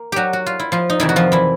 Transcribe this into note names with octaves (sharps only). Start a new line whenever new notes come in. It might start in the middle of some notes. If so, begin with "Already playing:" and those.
Already playing: A#3
F#3 F#4 G4
F#4
F4
E4
F3 F4
D#4
F2 C3 D#3 E3 E4
F#4
F3 F4
E3 E4